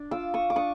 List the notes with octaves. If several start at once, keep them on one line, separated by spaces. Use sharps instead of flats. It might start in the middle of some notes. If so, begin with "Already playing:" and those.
Already playing: D4
F4 D6 E6
C#6 D#6
D6
D4 C#6 D#6